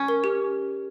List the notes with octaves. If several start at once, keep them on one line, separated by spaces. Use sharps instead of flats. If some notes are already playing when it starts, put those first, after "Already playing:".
Already playing: C#4
A#4
G4